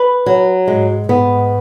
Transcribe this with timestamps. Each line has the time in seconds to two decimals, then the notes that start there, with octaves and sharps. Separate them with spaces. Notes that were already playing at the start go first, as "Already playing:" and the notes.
Already playing: B4
0.26 F#3
0.68 G#2 G#3
1.09 G#2 B3